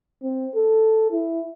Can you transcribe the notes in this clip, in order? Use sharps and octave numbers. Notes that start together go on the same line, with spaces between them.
C4
A4
E4